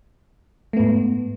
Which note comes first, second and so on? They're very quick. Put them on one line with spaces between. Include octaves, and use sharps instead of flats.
A3 B3 G#2